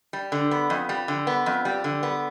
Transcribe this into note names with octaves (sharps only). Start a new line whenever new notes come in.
G3
D3
B3
F2
G3
D3
B3
F2
G3
D3
B3